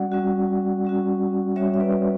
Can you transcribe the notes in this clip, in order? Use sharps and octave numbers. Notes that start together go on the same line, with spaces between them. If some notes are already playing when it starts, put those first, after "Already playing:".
Already playing: G3 C#4 F#4 D5 F#5
G3 C#4 F#4
G3 C#4 F#4
G3 C#4 F#4 C#5 E5
E5
B4 D5